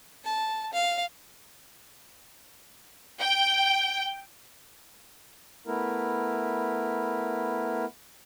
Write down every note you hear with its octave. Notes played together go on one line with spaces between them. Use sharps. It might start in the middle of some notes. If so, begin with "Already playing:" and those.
A5
F5
G5
A3 B3 E4 A#4